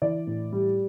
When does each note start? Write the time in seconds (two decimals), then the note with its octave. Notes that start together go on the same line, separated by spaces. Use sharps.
0.02 E3 D5
0.27 A2
0.52 G3